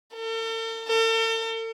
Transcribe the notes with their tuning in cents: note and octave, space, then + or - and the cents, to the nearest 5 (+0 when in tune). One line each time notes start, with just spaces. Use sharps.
A4 +45
A4 +45